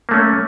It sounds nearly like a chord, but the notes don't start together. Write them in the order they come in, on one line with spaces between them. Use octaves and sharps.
A#3 A3 C#4